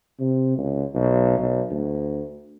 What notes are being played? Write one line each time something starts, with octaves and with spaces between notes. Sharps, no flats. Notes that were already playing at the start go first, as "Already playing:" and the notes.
C3
C#2
B1
B1
D2